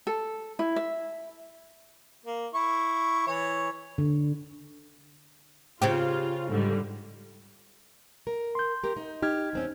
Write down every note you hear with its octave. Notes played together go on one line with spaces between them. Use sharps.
A4
E4
E5
A#3
E4 C#6
E3 C#5
D3
C#3 C4 F4 G4
G#2 D3 G3
A#4
C6 G6
G4 A#4
D#4
D#4 G4 F6 G#6
E2 C4 C#4